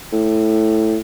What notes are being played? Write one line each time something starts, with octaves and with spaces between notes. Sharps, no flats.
A2